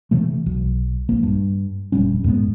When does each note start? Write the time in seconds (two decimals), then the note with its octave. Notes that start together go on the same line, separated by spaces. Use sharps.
0.11 C3 E3 A3
0.46 B1
1.09 A#1 A#3
1.23 G2
1.92 F1 A#2 G3 C#4
2.24 F#2 A2 G#3 B3